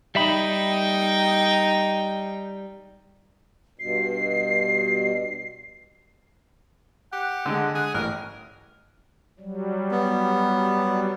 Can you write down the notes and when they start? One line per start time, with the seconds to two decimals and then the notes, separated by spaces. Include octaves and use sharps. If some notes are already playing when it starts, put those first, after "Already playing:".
0.15 G3 D#4 E5 G5 B5
3.79 G2 B2 C7
7.13 G4 F#5
7.45 D3 G#3
7.75 G#4
7.94 A1 A#4
9.40 F#3 G3
9.91 B3